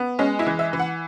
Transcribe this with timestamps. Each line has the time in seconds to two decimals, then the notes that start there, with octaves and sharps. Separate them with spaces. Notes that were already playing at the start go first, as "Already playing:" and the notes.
Already playing: B3
0.19 G#3 C#4
0.39 E4
0.46 E3
0.59 E5
0.73 E3
0.79 F#5